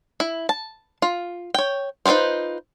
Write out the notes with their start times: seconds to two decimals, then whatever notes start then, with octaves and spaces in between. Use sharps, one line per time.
0.20 E4
0.49 A5
1.02 F4
1.54 C#5 G5
2.06 D#4 F4 G#4 B4 C5